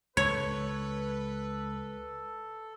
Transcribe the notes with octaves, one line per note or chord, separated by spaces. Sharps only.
C#2 A4 B4 C#5